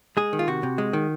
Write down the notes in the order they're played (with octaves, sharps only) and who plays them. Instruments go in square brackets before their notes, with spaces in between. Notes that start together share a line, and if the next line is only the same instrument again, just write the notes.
[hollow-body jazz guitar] G#3 G#4
D#3
F4
C3 F#4
C3
G#3
D#3